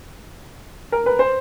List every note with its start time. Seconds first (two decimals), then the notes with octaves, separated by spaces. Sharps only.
0.92 A#4
1.06 B4
1.19 C5